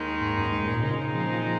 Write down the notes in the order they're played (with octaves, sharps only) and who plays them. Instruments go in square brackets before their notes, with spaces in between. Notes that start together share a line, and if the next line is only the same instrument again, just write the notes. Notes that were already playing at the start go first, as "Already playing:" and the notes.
Already playing: [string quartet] D#2 D#3 G#3 D#4
[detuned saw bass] G#2
F#2
G#2
G#2
A#2
[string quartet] A#2 G#3 C4 D#4 [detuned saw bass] C#3
[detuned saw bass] F3